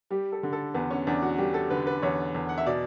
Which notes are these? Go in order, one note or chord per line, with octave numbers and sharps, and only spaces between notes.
G3 G4
A4
D3
A4
E2 B3
C#4
E2 D4
F#4
G3 G4
A4
D3 B4
B4
E2 C#5
E2
F#5
E5
B2 D5